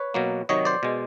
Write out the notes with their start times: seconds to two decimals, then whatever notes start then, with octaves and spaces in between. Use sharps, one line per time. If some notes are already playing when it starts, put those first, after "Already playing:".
Already playing: B4 C#5
0.14 B2 F#3 A#3
0.49 C3 D#3 F#3 C#5 D#5
0.65 C5 D5
0.83 B2 G#3